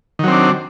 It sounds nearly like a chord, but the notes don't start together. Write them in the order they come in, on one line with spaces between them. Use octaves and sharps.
D#3 F#3 C4 D4